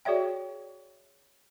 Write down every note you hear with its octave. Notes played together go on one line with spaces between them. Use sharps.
F#4 G#4 C#5 D5 E5 G5